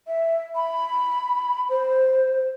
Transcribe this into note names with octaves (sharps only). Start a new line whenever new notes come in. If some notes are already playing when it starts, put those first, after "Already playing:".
E5
B5
C5